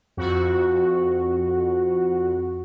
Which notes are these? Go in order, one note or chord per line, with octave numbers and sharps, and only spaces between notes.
F2 F#4